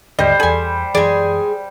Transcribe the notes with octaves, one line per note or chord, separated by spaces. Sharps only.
D#2 G#2 D3 G3 C5 D#5
E2 G#4 A4 G#5
F#2 E3 G#3 G#4 D5